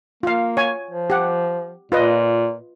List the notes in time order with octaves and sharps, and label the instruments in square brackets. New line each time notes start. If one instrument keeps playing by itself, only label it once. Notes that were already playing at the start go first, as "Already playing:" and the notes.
[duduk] A#3 [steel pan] F4 F5
[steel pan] C#5 G#5
[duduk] F3
[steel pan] G4 F#5
[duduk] A#2 [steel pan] F4 B4 D#5